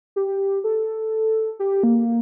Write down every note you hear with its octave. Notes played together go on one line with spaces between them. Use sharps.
G4
A4
G4
A#3